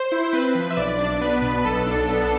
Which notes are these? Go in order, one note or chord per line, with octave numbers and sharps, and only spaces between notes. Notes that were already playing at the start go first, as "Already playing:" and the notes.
Already playing: C5
E4
C4 B4
F3
E5
B1 D5
D4
B3 B4
B2
B1 A4
D4
B3